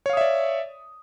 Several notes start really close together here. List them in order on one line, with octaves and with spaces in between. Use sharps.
C#5 F5 D#6 E5 D5